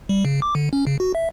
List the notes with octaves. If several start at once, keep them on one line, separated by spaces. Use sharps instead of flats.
G3
C#3
D6
D3
C#4
C#3
F#4
E5